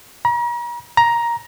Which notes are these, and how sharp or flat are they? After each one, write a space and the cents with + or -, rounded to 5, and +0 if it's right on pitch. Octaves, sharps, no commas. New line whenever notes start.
A#5 +40
A#5 +10